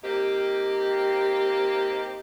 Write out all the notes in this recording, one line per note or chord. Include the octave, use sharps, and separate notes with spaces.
A#3 C4 D#4 G4